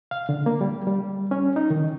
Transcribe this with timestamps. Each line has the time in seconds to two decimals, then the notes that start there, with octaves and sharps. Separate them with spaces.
0.11 F5
0.29 D3
0.46 A#3
0.61 G3
0.87 G3
1.31 C#4
1.56 D#4
1.71 D#3